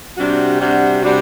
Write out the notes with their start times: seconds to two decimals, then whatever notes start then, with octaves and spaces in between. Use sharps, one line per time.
0.17 C3 G3 D4 F#4
0.60 C3 G3 D4 F#4
1.01 C3 G3 D4 F#4